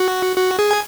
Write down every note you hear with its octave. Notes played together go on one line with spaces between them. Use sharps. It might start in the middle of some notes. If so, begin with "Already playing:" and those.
Already playing: F#4
F#4
G#4
G#5